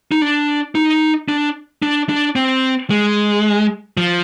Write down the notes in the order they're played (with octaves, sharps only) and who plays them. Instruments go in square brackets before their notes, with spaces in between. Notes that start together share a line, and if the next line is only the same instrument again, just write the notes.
[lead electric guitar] D#4
D4
D#4
D4
D4
D4
C4
G#3
F3